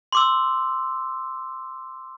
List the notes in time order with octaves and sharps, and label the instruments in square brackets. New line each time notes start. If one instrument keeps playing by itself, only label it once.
[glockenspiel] C6 D6 E6